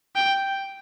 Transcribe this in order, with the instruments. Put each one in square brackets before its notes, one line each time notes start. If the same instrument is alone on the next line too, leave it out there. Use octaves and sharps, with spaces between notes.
[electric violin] G5